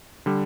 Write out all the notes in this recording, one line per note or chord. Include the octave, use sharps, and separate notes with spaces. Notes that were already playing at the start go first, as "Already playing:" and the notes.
D3 G3